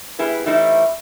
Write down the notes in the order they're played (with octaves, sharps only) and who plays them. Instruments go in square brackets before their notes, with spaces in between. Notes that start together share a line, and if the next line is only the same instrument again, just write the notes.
[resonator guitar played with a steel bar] G3 B3 E4 G#4 B4
E3 G3 A3 C4 D#4 E4